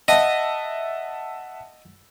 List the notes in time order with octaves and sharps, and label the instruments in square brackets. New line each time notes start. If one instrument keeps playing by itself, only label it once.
[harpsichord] D#5 [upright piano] E5 F#5 A5